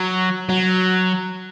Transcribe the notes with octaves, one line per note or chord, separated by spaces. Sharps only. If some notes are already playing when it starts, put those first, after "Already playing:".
Already playing: F#3
F#3